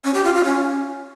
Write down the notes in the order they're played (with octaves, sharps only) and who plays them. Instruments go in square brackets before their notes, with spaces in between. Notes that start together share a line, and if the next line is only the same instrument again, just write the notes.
[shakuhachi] C#4
G4
F4
F4
C#4